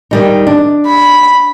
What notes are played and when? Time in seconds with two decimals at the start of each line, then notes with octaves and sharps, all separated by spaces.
0.11 D#3 G3 D#4
0.47 D4
0.87 B5